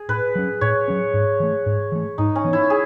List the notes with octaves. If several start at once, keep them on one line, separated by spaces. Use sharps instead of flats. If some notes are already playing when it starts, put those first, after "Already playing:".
Already playing: G#4
A2 B4
F#3 C#4
A2 C#5
F#3 C#4
G#2
E3 A3
G#2
E3 A3
G#2 D#4
C#4
E3 B3
E4
G#4